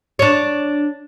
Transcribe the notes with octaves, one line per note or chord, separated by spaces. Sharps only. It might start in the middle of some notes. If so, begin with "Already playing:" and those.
D4 C#5